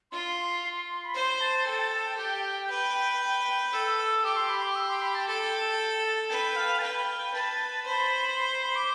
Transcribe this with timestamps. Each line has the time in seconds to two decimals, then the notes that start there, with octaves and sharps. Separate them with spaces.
0.11 F4 C6
1.04 B5
1.14 C5 C6
1.41 A5
1.66 A4 G5
1.79 A5
1.92 A5
2.05 G5
2.17 G4 G5
2.70 B4 G5
3.21 G5
3.72 A4 E6
3.98 E6
4.24 G4 D6
4.37 C6
4.49 B5
4.63 D6
4.76 E6
4.89 C6
5.02 B5
5.14 A5
5.28 A4 G5
6.04 A5
6.30 B4 G5
6.56 F5
6.79 A5
6.82 B4 G5
7.33 B4 A5
7.85 C5 B5
8.36 C6
8.50 C6
8.63 B5
8.75 D6